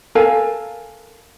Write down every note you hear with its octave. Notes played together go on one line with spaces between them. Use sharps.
A4 A#4 F5 G#5